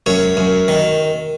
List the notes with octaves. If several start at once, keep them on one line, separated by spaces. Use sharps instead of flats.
F#2 C#5
F#2
D#3